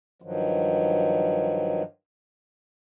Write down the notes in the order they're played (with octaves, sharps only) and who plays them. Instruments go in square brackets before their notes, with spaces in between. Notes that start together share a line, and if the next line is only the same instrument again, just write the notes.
[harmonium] G2 D#3 F3 F#3